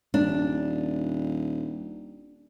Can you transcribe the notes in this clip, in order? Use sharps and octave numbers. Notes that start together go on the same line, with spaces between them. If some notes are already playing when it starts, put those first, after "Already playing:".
D#1 D4